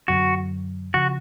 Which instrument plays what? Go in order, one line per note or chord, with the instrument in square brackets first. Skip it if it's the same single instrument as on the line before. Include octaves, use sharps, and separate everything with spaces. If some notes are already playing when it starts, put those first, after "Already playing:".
[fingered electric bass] F#2 D3 F#3 [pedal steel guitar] F#4
[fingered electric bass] C#3 F3 [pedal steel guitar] F#4